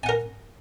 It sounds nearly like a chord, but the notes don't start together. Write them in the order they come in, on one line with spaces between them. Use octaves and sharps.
G#5 F#5 A#4